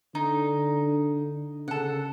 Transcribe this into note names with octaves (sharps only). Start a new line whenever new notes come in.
D3 D#4
C#3 A4 F#5